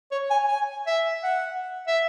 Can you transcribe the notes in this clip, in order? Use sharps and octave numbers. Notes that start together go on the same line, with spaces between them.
C#5
G#5
G#5
E5
F#5
E5